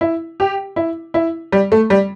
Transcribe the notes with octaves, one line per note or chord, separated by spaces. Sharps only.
E4
G4
E4
E4
G3
A3
G3